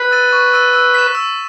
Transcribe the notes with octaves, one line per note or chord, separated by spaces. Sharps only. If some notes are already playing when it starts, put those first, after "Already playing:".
Already playing: B4
E6 A6 D#7
C#6
E6 A6 D#7
E6
B6 E7
E6